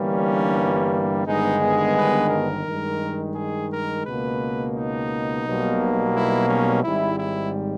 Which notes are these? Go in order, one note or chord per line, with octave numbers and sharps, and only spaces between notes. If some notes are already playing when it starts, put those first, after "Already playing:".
Already playing: G1 G2 E3 G3 A#3 C#4
G1 G2 D#3 G#3 B3 D#4
G#4
B4
A#4
G2 D#3 G#3
G#4
A#4
C#2 B2 A#3 B4
D#4
B1 B2 G3 A#3
E4
C#4
G#1 G#2 G3 E4
E4